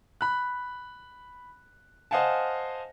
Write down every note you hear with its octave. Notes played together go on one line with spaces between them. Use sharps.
B5 F#6
C5 D#5 F5 F#5 G#5 A5